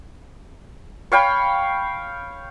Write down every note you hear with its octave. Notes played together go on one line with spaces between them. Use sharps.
C#5 F5 G5 B5